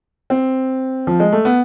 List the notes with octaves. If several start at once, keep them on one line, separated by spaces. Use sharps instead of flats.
C4
F3
G#3
A3
B3